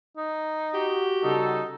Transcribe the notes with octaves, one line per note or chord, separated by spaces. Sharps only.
D#4
F#4 G4
C#3 G3 D#4 A4